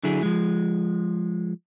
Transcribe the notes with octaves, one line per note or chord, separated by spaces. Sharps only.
D3 F#3 E4 G#4
F3 G#3